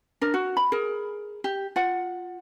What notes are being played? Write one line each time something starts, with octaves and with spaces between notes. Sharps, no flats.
D4 A#4
F#4
B5
G#4 A#4
G4
F4 F#5